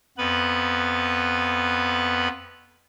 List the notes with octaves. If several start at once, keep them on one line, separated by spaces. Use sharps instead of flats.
F2 B3 B4 B5